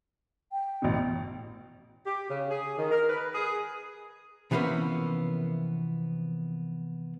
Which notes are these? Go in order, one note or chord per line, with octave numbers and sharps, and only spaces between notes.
G5
A1 B2
G4
C#3
G#4
D#3
A#4
B4
G#4
C3 E3 F3 A#3 B3 C#4